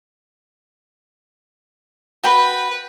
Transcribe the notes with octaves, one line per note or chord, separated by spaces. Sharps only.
F#4 B4 G5 B5